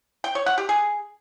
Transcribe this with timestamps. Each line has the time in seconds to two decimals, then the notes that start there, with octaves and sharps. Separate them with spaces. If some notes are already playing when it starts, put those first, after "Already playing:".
0.24 G5
0.35 C#5
0.46 F#5
0.58 G4
0.69 G#4